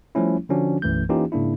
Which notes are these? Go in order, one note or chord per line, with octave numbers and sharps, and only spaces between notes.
F3 G3 A3 C#4 E4
D3 F3 C#4 D4 F#4
B1 F#2 E3 A3 G6
E3 A#3 C#4 D#4 F4 G4
G#2 C#3 A#3 D4 E4